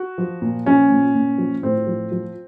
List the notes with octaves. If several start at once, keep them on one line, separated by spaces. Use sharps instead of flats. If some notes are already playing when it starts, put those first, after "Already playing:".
Already playing: F#4
F3
A#2
F3 C#4
A#2
A#2
F3
A2 C4
F3
F3